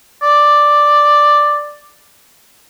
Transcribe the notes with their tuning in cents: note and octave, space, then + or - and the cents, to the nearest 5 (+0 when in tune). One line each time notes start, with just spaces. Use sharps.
D5 +5